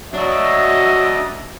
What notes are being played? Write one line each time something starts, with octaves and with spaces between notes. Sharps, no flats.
F#3 D4 F#4 D#5 E5